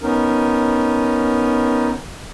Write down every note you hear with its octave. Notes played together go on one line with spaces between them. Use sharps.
B3 C#4 D#4 A#4